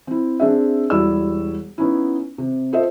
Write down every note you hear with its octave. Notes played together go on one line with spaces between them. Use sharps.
C4 E4
C4 D4 G#4 E5
E1 G3 E4 F#4 D5 E6
B3 C#4 D#4 E4
C3
F4 A4 C5 D#5 E5